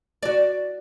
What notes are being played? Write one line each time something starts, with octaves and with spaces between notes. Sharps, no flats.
F#4 D5